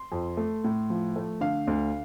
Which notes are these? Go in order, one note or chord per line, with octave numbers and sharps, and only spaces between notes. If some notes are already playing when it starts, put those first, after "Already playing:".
Already playing: C6
F2
A3
A2
F3
A3
D3 F5
D2